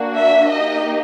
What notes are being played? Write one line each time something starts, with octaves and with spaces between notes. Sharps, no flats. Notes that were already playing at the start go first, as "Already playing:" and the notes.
Already playing: A#3 D4 F#4
E5
A#3 D#4 G4 D#5